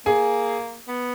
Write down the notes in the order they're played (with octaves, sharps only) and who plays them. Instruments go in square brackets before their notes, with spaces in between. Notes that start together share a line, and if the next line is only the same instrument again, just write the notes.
[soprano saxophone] A#3 [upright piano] G#4 G#5
[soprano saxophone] B3